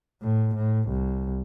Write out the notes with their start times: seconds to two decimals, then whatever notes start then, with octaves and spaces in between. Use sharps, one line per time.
0.22 A2
0.55 A2
0.89 C2